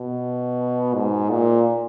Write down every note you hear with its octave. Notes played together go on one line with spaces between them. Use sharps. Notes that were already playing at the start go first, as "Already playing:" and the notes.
Already playing: B2
G#2
A#2